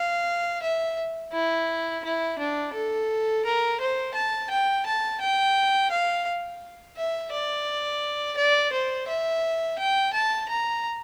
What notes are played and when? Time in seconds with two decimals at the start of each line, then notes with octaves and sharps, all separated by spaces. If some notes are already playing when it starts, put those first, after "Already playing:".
Already playing: F5
0.62 E5
1.32 E4
2.04 E4
2.39 D4
2.73 A4
3.45 A#4
3.80 C5
4.14 A5
4.50 G5
4.86 A5
5.20 G5
5.91 F5
6.97 E5
7.31 D5
8.37 D5
8.72 C5
9.08 E5
9.78 G5
10.13 A5
10.48 A#5